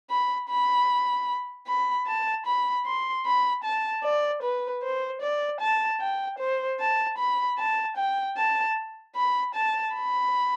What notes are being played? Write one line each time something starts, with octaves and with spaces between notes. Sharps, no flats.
B5
B5
B5
A5
B5
C6
B5
A5
D5
B4
C5
D5
A5
G5
C5
A5
B5
A5
G5
A5
B5
A5
B5